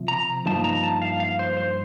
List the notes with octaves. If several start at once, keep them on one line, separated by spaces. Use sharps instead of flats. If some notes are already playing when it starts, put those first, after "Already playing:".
Already playing: C3 F3
A#5
G2 F3 A#3 D#4 A5
A#5
A5
F5
F5
C5
C5